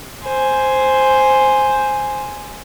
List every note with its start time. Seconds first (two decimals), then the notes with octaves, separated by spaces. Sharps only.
0.24 C5 G#5